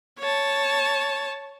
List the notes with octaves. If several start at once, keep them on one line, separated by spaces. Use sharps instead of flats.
C#5 A5